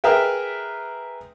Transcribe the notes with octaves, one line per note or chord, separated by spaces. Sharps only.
G#4 A#4 B4 E5 G5